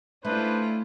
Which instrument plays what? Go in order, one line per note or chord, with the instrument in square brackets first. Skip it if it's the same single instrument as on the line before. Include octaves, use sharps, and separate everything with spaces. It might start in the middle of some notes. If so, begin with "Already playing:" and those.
[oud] A3 [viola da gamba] C#4 E4 F4 [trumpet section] D4 B4 [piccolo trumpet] C5